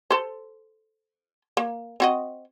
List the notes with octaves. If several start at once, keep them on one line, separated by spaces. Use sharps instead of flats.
A4 C5
A#3
C4 F#4 D#5